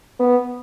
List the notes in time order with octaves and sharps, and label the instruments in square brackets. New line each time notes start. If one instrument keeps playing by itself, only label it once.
[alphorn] B3